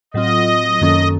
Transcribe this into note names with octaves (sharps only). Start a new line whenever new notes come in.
A2 F#3 C4 F4 D#5
F#2 D#3 A#3 C#4 A4